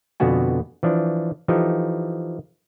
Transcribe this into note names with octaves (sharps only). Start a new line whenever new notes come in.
F2 B2 D3 B3 F#4 G#5
E3 F3 D4
E3 F3 D#4 G4 A4